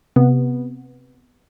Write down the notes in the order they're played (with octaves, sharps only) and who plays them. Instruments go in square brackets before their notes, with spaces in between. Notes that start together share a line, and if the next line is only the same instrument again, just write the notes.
[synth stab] C3 B3